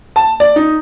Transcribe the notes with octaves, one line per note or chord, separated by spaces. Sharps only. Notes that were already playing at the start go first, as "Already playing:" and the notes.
A5
D5
D#4